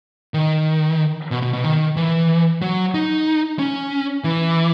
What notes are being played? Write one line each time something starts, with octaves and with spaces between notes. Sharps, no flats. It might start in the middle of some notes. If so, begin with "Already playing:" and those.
D#3
B2
B2
B2
D#3
E3
F#3
D#4
C#4
E3